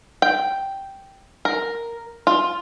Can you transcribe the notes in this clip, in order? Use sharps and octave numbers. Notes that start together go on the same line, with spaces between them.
G5
A#4
F4